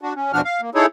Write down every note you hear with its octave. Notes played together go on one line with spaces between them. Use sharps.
D4 F#4
C#4
E2 B2 F3 D4 F#4 F6
F5
A#3
D#4 E4 G#4 A4 C#5